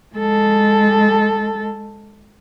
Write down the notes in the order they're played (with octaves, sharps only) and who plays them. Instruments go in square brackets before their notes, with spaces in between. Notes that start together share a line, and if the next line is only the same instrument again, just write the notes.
[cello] G#3 A4